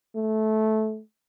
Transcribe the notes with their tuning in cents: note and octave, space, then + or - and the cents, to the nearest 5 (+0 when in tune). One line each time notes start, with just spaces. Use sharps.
A3 -15